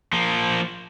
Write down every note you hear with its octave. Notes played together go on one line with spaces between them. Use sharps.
F3 A#3